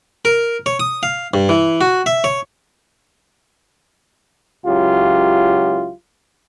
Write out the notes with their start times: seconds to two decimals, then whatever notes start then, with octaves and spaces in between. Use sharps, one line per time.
0.25 A#4
0.66 C#5
0.80 D#6
1.03 F5
1.34 G2
1.49 E3
1.81 F#4
2.06 E5
2.24 C#5
4.65 C#2 F#3 E4 F4 G4